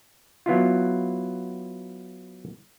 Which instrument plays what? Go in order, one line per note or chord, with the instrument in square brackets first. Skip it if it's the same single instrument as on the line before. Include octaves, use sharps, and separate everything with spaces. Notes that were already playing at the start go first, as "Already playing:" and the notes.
[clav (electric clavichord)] F#3 B3 E4 F4